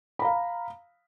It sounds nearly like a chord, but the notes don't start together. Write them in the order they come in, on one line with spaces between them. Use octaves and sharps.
B5 A#5 F5